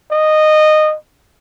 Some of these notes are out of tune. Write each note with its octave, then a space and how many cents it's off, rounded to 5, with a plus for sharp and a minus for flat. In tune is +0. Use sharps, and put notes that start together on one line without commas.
D#5 -15